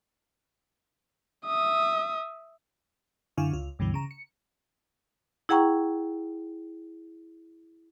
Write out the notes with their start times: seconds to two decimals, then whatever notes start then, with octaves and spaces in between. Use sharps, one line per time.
1.45 E5 D#6
3.37 F#2 D3 E4 F5 G#5 C#6
3.53 C#2 F4
3.79 C#2 G2 B2 D3 E3
3.94 C#3 A#5
4.11 C#7
5.49 E4 G#4 F#5 G5 A#5 C#6